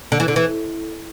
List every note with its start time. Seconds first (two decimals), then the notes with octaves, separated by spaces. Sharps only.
0.12 D3
0.20 E3
0.28 D3
0.36 E3